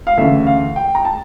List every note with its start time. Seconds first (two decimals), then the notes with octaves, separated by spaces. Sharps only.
0.07 F5
0.18 D2 C#3 E3 E5
0.47 F5
0.76 G5
0.95 A#5
1.05 A5